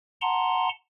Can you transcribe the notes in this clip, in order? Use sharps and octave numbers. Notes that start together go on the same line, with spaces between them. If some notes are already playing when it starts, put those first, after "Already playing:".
F#5 A5 A#5 C6